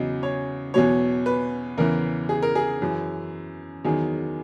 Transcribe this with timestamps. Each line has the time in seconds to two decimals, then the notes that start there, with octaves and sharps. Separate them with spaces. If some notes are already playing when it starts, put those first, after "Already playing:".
Already playing: E2 C#3 F#3 D#5
0.23 C#5
0.74 E2 B2 F#3 C#5
1.26 B4
1.78 E2 C#3 E3 A#4
2.29 G#4
2.42 A#4
2.55 G#4
2.82 F#2 E3
3.84 E2 D#3 F#3 G#4